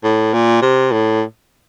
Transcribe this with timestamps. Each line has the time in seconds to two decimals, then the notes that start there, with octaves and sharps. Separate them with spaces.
0.04 A2
0.33 A#2
0.62 C3
0.92 A2